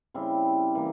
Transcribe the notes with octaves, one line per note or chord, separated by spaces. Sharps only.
C#3 G3 C4 E4
E3 A#3